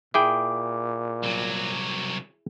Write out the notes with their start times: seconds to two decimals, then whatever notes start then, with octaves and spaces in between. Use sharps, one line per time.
0.14 A#2 E4 G#4 G5 D6
1.23 C2 F#3